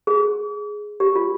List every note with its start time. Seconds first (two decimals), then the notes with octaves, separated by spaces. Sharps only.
0.07 G#4
1.00 G4
1.15 F4